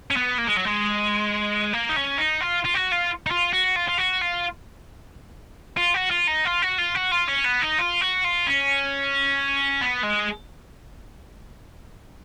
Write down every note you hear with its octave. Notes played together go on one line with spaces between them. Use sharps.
C#4
B3
A#3
G#3
F#3
G#3
A#3
D#4
C#4
D#4
F4
F4
F#4
F4
D#4
F4
F#4
F4
F4
F#4
F4
F4
F#4
F4
D#4
F4
F#4
F4
F#4
F4
C#4
B3
D#4
F4
F#4
F4
C#4
B3
G#3